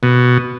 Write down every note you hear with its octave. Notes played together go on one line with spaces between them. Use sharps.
B2